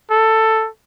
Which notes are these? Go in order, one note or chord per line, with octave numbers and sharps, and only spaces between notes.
A4